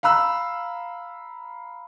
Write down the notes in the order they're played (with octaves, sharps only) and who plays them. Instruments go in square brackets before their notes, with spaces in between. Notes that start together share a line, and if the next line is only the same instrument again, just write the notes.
[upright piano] F5 A#5 B5 E6